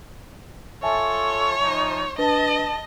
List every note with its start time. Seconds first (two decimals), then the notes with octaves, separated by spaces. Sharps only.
0.83 F4 A4 C#5 E5 G#5 A5
1.61 F3 D#4
2.18 D4 B4 D#5 A5